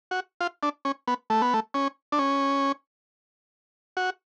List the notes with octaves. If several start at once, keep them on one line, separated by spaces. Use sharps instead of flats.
F#4
F4
D4
C#4
B3
A3
B3
A3
C#4
D4
C#4
F#4